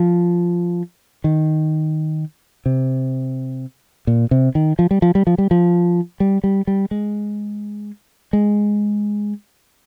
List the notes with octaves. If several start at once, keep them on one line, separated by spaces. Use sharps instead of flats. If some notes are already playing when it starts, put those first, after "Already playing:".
Already playing: F3
D#3
C3
A#2
C3
D#3
F3
G3
F3
G3
F3
G3
F3
G3
G3
G3
G#3
G#3